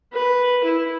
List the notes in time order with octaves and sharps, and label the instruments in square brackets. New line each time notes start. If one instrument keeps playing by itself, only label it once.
[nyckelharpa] B4
E4